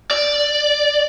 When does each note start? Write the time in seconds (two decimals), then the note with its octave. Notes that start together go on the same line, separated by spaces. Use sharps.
0.11 D5